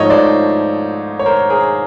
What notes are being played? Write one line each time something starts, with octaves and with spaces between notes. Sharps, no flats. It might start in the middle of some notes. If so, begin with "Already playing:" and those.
Already playing: G#2 F3 A3 C#5 D#5
C5 D5
C#5
A#4 C5
G#4 A#4